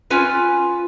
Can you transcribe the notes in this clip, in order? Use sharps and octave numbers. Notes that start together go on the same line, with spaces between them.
C#4 F4 B4 G#5